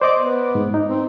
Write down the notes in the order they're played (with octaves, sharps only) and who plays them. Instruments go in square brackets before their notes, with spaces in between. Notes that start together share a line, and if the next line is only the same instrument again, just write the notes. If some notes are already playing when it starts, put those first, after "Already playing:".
[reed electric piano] C5 D#5 D6 [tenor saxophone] D5
[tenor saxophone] B3
[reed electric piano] G#2
D#4
[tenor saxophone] C4